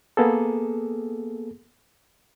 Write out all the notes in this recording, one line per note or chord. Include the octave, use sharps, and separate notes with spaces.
A#3 B3 G#4 A4